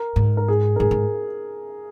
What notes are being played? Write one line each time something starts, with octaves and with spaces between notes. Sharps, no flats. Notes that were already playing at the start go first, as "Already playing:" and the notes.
Already playing: A#4
G#2
A#4
G#4
A#4
G#2 G#4
G#2